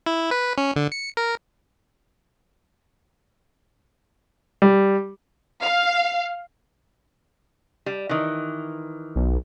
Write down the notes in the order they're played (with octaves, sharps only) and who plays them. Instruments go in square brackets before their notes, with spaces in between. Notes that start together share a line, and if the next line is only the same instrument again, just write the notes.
[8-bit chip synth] E4
B4
C#4
D3
C#7
A#4
[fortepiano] G3
[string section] F5
[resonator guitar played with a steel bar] G3
D#3 E3
[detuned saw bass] B1